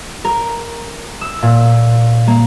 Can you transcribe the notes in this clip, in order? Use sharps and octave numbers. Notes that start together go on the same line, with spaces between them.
A#4
E6
A#2
A#3